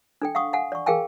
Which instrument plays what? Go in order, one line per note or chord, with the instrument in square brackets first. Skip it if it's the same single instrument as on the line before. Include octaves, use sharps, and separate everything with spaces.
[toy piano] D4 A4 G5
F5 F#5 C#6 D#6
F5 F#5 G#5
D5 C#6
G#4 A#4 F5 G5 G#5